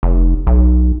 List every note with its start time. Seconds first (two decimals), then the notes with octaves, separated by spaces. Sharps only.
0.03 F1
0.47 B1